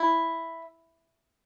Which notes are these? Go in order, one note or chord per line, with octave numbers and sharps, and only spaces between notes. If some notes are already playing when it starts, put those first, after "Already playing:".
Already playing: E4